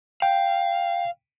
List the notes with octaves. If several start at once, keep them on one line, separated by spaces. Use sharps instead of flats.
F5 G5